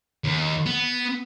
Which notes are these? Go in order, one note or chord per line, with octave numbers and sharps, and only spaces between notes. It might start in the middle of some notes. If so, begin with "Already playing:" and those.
D#2
B3